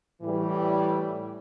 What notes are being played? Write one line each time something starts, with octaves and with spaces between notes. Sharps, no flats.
A2 E3 G3